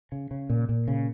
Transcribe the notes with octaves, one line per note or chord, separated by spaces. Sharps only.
C#3
C#3
A#2
A#2
C#3